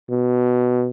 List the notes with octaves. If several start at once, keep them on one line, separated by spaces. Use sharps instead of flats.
B2